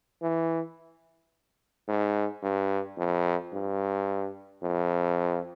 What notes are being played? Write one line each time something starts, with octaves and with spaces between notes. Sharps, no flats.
E3
G#2
G2
F2
G2
F2